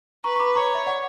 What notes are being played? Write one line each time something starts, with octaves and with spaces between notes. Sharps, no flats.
B4 A#5 C#6
C#6
B5 D6
C#5 A#5 C#6
E5
D5 F#5